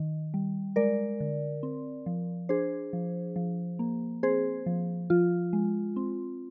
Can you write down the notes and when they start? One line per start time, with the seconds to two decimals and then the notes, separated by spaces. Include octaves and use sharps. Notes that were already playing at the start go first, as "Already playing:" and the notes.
Already playing: D#3
0.34 G3
0.76 G#3 A#4 D5
1.20 D3
1.63 C4
2.06 F3
2.49 D4 G#4 C5
2.93 F3
3.36 F3
3.79 A#3
4.23 C4 G#4 C5
4.66 F3
5.10 F3 F4
5.53 G#3
5.96 C4